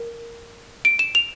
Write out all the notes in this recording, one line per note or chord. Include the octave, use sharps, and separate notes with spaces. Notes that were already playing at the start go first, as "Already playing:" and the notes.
Already playing: A#4
D7
E7
F7